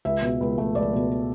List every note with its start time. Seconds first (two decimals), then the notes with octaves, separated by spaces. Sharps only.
0.05 C#2 E5
0.22 B2
0.41 C#2
0.58 A3
0.75 C#2 D5
0.93 B2